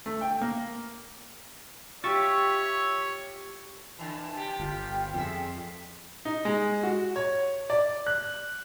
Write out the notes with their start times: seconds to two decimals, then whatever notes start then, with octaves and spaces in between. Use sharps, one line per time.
0.06 A3
0.21 G5
0.41 A#3
2.04 F4 G4 C#5 E5 C#6 E6 A6
3.99 D3 E3 A5
4.34 C3 G4 G5
4.60 G1 F4
5.14 F2 G#4 E5
6.25 D#4
6.45 G#3
6.83 F#4
7.16 C#5
7.70 D5
8.07 F#6